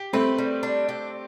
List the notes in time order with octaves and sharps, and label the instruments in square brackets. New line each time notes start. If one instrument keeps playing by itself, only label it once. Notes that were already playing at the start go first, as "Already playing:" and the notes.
Already playing: [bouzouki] G4
[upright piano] A3 C4 [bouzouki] B4
[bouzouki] G3
D4
G4